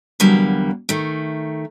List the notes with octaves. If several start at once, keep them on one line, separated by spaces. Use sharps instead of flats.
E2 D3 F#3 G3 A#3
D#3 A3